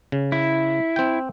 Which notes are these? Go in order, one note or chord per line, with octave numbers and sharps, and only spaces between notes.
C#3
E4
C4 G5